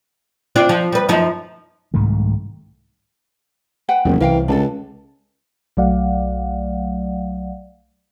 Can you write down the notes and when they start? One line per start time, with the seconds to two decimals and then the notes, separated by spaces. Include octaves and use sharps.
0.56 C4 D4 F4
0.69 F3
0.92 G3 B4
1.09 F#2 F3 D#4
1.94 C2 G#2 D#3 A3
3.89 B4 F#5 G5
4.05 F#1 E2 C3 D#3
4.20 C2 E3 A#4 F5 G5
4.48 C#2 D4 A4
5.77 B1 F#3 A3 D5 F5 F#5